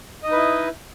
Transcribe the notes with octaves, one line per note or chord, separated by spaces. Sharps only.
D#4 E4 B4 D#5